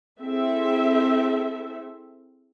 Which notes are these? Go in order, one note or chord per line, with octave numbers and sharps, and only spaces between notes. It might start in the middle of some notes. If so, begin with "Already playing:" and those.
C4 E4 G#4 A4 E5